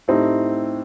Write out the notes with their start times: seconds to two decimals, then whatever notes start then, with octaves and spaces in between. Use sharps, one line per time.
0.08 A2 A3 C4 D#4 G4